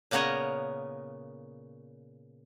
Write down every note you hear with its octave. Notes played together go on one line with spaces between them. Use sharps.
A#2 C#3 B3 A#4 C#5 D#5